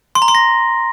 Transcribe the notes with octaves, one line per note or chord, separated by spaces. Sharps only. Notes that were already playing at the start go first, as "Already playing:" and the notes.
C6
A#5
C6
A#6